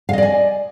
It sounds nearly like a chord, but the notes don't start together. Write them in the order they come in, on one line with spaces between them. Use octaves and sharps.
F5 D#5 D5 G#5